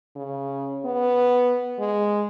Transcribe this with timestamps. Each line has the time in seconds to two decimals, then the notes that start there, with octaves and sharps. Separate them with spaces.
0.16 C#3
0.85 B3
1.79 G#3